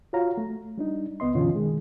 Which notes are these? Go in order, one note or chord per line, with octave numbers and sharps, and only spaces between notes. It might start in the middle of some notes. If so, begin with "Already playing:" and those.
F4 F#4 C#5 F5 A#5
A3
G3 D4 D#4
C#2 B3 D#5 C6
F#2 B2 D3 E3 C#4 F4
D#3 G#3